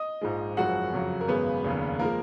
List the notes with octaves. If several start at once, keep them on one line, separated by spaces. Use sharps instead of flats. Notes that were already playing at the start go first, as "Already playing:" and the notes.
Already playing: D#5 D#6
A#1 G#2 F3 G#3
F#1 F#2 F3 G#3 F#4 F#5
F2 C#3 F#3
A#4
G#1 F#2 C#3 G#3 B3 B4
F1 D#2 C#3
F3 G#3 A#3 A#4